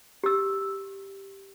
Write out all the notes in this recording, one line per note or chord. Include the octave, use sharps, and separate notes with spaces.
G4 E6